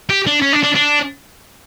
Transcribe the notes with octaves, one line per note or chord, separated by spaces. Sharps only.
G4
D4
C#4
D4
D4
D4